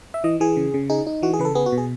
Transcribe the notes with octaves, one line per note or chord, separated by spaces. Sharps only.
E5
E3 D#5
E3 G#4
C#3
C#3
D#4 G#4
D#4
E3 F#4
G#4
C#3 B4
A4
B3 G#4
F#4
B2
G#4